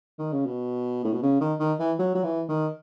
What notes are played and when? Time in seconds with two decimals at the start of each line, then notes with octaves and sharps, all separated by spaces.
0.19 D#3
0.32 C#3
0.46 B2
1.05 A2
1.13 B2
1.23 C#3
1.41 D#3
1.60 D#3
1.79 E3
1.99 F#3
2.15 F#3
2.24 E3
2.49 D#3